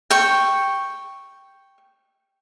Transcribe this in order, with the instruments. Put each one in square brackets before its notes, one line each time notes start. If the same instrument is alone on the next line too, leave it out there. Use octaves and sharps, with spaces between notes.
[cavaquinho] G5 C#6